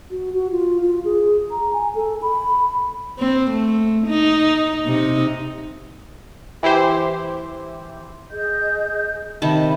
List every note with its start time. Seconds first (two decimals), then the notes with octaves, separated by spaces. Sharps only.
0.11 F#4
0.33 F#4
0.52 F4
0.82 F4
1.05 G#4
1.51 A#5
1.74 G#5
1.95 A4
2.22 B5
3.19 C4
3.50 A3
4.07 D#4
4.86 C3 D#4
6.63 E3 E4 G4 C5
8.31 G#4 D#5 G6
9.42 C3 D#3 D#5 E5 A5 B5